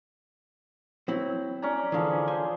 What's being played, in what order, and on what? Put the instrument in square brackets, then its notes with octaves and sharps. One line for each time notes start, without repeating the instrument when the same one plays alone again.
[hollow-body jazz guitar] F#3 C4 E4
[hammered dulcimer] C#4 D5 A#5
[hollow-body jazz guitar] D3 E3 [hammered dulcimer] F3 G#4
[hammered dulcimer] C5 [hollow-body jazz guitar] G#5